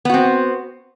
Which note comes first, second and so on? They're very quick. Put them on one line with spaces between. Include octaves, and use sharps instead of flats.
B3 F#4 C4